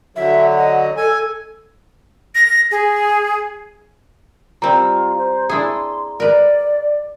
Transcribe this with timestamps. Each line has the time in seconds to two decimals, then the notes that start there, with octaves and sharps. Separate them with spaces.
0.16 D3 F#3 E5
0.58 D#5
0.97 A4 G#5
2.35 A#6
2.71 G#4
4.62 G3 C4 F4 A#5
5.18 C5
5.49 D4 E4 G#4 C6
6.20 A#4 B4 D5